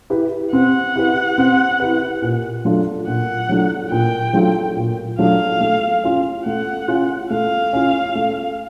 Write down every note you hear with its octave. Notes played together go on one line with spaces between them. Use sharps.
E4 G4 B4
C4 F#5
E4 G4 B4
C4
E4 G4 B4
A#2
F#3 A3 D4 F4
A#2 F#5
F#3 A3 D4 F4
A#2 G5
F#3 A3 D4 F4
A#2
F#3 A3 D4 F4 F5
A3
C#4 F4
A3 F#5
C#4 F4
A3 F5
C#4 F4
A3